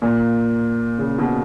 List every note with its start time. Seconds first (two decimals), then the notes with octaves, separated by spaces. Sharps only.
0.02 A#2
0.98 C#3
1.18 B2